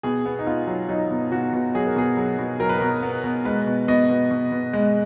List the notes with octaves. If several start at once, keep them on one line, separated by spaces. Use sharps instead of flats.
B2 G#4
B3
D#4
B3 F4
F#3
F#3 D#4
B2
B2 F#4
B2
F#3 G#4
A#4
B2 G#4
F#3
B2
F#3 A#4
B4
B2 A#4
B3
B2
G#3 B4
B2
B2 D#5
B2
B2
B2
G#3